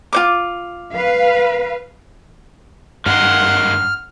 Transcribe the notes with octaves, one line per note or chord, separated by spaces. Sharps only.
F4 C5 D6
B4 F5
G2 D#3 G#3 A#3 F#5 C6 F6